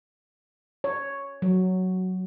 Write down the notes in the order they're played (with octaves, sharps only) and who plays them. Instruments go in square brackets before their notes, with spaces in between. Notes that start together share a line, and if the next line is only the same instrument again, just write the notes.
[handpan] C#5
F#3